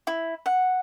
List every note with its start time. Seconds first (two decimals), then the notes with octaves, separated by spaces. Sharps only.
0.07 E4
0.46 F#5